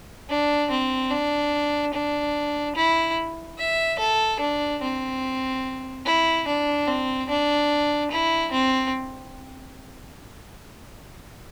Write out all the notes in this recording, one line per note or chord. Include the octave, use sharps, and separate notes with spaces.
D4
C4
D4
D4
E4
E5
A4
D4
C4
E4
D4
C4
D4
E4
C4